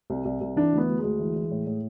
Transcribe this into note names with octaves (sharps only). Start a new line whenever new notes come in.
C2
C2
C2
E3 D4
D2
B3
D2
G#3
D2
E3
E3
A2
A2